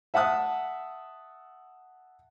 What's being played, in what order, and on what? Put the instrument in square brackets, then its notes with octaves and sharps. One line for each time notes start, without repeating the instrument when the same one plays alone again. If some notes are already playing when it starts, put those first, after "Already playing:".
[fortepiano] E5 F#5 A5 D#6 F#6